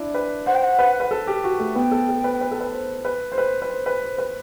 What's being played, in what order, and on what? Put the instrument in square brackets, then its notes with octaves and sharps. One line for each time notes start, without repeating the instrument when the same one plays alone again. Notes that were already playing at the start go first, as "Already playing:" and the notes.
Already playing: [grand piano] D4 E4
B4
[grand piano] C5 [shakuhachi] F#5
[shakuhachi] G5
F#5
[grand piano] B4
B4
A4
G4
F#4
A3
[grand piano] B3 [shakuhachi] G5
[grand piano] A4
A4
B4
B4
A4
B4
C5
B4
C5
B4
B4
C5
B4
C5
B4